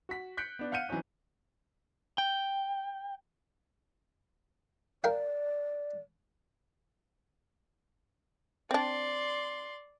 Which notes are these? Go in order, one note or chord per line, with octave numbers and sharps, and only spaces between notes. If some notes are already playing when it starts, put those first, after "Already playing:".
F#4 F#5 B6
F#6 G6 B6 C#7 D7
B3 D4
F5 F#5 F6 G6 C#7 D#7
E3 F#3 C4 C#4 D#4
G5
A#4 D5 F5 G5
C4 D4 D5 C6